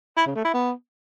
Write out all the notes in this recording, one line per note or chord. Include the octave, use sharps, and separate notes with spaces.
E4
C#3
A3
E4
B3